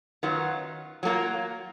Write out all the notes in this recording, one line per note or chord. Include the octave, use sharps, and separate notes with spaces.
F#2 D#3 F#3 B3 F4
F#3 A#3 F4 A#4